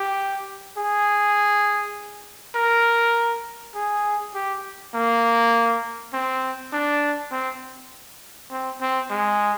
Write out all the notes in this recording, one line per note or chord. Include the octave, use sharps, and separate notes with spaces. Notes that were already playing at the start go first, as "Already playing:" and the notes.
Already playing: G4
G#4
A#4
G#4
G4
A#3
C4
D4
C4
C4
C4
G#3